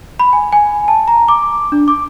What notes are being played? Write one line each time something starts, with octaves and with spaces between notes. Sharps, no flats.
B5
G#5
G#5
A5
A#5
D6
D4
D6